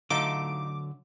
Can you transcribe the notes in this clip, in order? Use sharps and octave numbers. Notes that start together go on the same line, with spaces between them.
D3 F#3 A3 D#4 F4 D6